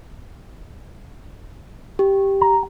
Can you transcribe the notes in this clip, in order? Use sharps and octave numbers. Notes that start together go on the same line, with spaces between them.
G4
A#5